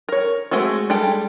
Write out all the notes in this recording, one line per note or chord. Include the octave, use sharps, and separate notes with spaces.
A#4 C#5
G#3 A3 C4 F#4
G3 G#3 A4 G5